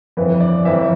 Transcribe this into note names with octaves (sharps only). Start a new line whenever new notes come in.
G1 F2 E3 B4
D5
G1 F2 E3 E5